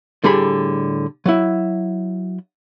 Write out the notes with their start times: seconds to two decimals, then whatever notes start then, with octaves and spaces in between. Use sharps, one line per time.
0.24 A2 D3 G3 G#4 B5
1.26 F#3 E4